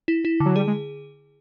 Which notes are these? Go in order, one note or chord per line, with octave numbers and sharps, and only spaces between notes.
E4
E4
D3
F#3
G3 G#4
G#3